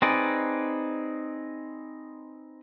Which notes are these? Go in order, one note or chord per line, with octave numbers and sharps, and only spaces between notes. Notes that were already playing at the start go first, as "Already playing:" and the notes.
C4 D#4 G#4 B4 D5